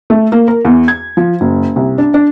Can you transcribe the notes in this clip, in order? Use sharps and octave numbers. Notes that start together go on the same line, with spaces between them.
A3
A#3
A#4
E2
G#6
F3
F#1
C2
D4
D4